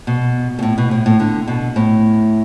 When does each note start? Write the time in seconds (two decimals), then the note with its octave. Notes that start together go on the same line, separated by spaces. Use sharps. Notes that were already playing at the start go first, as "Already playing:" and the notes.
0.07 B2
0.59 B2
0.63 A2
0.78 B2
0.91 A2
1.06 A2
1.20 D3
1.48 B2
1.76 A2